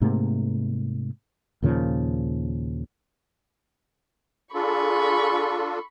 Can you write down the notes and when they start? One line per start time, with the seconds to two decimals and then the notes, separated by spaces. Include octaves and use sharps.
0.01 G#2 C3 A3 A#3
1.62 D#2 A#2 C#3 F3
4.54 D4 F4 G#4 A4 B5 C#6